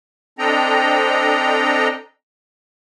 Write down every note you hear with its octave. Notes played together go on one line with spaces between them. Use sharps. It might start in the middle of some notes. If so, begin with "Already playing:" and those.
C4 D4 A4 D#5 G5 A#5